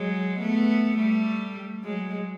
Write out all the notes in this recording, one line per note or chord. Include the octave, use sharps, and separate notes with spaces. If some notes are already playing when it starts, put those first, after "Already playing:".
Already playing: F#3 G#3
A3 B3
G3 A3
F#3 G#3